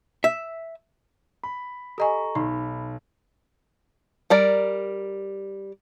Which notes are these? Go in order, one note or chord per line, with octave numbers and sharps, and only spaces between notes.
E5
B5
G4 A4 D#5 G#5 A#5 C#6
B1 D#4 B5
G3 A#4 D5